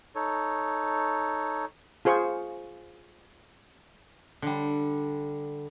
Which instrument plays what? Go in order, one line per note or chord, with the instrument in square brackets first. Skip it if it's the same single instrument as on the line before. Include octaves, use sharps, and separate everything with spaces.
[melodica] D#4 A4 C#5
[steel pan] F4 G#4 C5 C#6
[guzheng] D3 G3